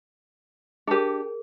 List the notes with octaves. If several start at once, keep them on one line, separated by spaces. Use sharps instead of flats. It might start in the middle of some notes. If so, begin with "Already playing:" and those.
D4 G4 G#4 A#4